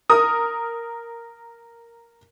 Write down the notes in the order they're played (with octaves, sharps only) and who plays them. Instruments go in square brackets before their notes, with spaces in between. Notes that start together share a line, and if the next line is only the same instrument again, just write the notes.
[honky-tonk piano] A#4 D#6